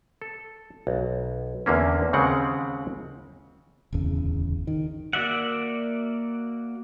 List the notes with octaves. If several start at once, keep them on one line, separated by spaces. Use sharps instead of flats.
A4
B1
E2 D3 A#3 C#4
D#2 C#3 G#3 C4 F#5
D1 G1 E2 C#3
D#3
A#3 F#4 D5 E5 F#5